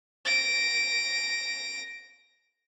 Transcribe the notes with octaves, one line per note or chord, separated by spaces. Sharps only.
A#6 D7